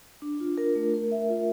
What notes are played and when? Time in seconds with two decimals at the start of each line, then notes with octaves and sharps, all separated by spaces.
0.22 D4
0.40 F4
0.58 A#4
0.75 A3
0.94 A#4
1.11 E5
1.29 F4